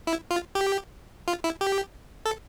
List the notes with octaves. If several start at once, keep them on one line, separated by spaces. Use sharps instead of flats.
E4
F4
G4
F4
E4
G4
A4